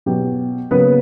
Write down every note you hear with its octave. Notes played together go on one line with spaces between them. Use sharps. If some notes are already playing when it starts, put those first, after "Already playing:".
B2 F#3 B3 G4
C#3 F#3 A#3 B3 C#4 B4